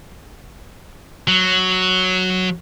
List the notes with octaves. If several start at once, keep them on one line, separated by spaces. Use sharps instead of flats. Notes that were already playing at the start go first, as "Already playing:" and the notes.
F#3